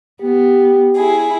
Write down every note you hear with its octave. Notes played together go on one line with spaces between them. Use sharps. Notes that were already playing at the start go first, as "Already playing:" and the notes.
B3 G4
E4 G#4